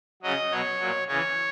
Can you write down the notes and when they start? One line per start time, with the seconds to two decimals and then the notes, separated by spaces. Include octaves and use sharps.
0.22 C#3 F#3 D#5
0.51 B2 F#3 C#5
0.80 A#2 F#3
1.08 C#3 E3 C#5